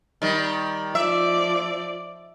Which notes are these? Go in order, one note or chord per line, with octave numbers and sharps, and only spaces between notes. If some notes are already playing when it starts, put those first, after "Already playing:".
D#3 G3
F3 D5 E5